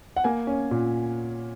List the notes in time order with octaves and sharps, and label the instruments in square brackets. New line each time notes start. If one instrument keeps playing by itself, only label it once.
[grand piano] F#5
A#3 G#5
C#4
A#2